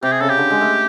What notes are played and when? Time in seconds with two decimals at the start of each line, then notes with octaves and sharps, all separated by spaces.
0.03 C3 G4
0.12 G#4
0.20 C#3 A4
0.29 G4
0.37 D3
0.50 G#3
0.61 A3